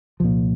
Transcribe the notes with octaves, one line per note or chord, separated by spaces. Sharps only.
C2 A#2 F3